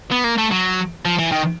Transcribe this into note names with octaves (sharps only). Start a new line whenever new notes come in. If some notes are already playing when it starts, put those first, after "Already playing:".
B3
A#3
A3
F#3
F3
E3
D#3